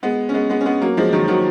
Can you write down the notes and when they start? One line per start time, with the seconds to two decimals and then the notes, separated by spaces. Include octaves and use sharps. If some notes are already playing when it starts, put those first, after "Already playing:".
0.03 G#3 B3
0.29 C#4
0.34 G#3 B3
0.49 G#3 B3
0.61 C#4
0.65 G#3 B3
0.82 F#3 A#3
0.97 F3 G#3
1.13 D#3 F#3
1.28 D#3 F#3